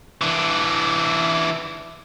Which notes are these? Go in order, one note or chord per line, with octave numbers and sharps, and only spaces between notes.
E3 D4